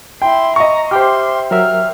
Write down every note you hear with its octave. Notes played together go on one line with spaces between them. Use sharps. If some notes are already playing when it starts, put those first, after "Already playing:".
E4 G5 C6
D#5 A#5 C#6
G4 C5 E5 G5 C6 D6 F6
F#3 A#4 E5 F6